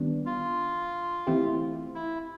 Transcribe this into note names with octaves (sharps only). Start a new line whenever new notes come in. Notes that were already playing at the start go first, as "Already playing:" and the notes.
Already playing: D#3 G3 B3 D4
F4
E3 A3 C4 E4 G4
E4